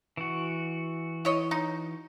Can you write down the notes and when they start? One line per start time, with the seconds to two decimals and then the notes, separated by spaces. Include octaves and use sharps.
0.17 E3 F#4
1.25 E4 C#5 D#5
1.51 D#4